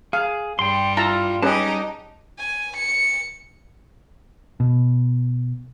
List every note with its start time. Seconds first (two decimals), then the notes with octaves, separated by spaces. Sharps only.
0.13 G#4 F5
0.59 G2 G3 G5 C6
0.97 E4 F4 A5 A#5
1.42 G3 C#4 D#4 G4 G#4 B4 D#5 A5
2.39 G#5
2.77 C#7
4.60 B2